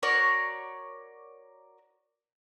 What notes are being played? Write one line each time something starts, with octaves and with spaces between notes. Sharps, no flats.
F#4 A#4 C#5 D5